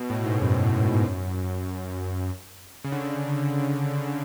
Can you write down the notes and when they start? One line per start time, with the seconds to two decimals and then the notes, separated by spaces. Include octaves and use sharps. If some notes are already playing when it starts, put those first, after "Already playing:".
Already playing: B2
0.10 A2
0.25 G#2
0.41 F#2
2.84 C#3
2.92 D3